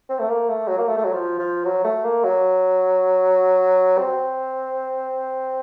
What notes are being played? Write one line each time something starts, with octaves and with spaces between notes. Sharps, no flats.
C4
A3
A#3
A3
F#3
A#3
A3
A3
F#3
F3
F3
F#3
A3
A#3
F#3
C4